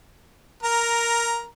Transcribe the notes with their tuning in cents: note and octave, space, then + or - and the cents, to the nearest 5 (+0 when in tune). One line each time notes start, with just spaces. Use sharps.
A#4 +0 A#5 +10